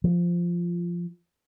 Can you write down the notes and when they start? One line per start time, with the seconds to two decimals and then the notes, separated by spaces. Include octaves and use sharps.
0.04 F3